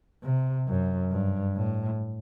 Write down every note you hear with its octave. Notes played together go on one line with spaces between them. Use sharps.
C3
F#2
G2
A2